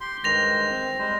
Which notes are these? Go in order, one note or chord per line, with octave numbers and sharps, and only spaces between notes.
G4 C6
G2 D#3 G#3 C5 A#6 F7
C4
G3 G#3 C5